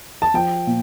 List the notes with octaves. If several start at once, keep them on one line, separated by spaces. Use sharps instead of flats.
A5
F3 G5
A#2